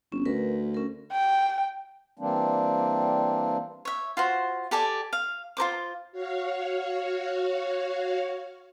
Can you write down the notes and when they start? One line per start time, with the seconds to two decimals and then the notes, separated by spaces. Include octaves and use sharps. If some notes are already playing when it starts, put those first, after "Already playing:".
0.12 G1 C#4
0.25 D2 A#4 B4
0.74 C#4 A#4
1.12 G5
2.19 E3 G3 A#3 C4 D4
3.85 C#5 E5
4.17 F4 F#4 C5
4.71 G4 A4 D5 G#5
5.13 F5
5.57 F4 A#4 C5 D6
6.12 F#4 C#5 F5